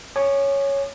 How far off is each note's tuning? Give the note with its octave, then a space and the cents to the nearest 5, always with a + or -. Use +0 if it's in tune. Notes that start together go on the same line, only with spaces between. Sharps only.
C#5 +0 G#5 +0 D6 +45